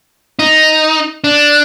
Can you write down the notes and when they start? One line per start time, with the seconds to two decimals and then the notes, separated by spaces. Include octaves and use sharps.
0.39 D#4
1.24 D4